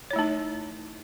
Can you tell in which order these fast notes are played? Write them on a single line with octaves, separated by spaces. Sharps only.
C#5 E4 A3 D#4